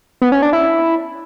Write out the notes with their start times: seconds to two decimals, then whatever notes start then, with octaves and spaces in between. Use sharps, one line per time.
0.22 B3
0.32 C#4
0.42 D4
0.53 E4